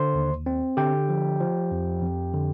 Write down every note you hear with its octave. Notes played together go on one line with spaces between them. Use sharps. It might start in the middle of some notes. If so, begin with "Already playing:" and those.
Already playing: D3 C5 C6
D#2
C4
D3 G4 G5
F3
F3
F2
F2
D3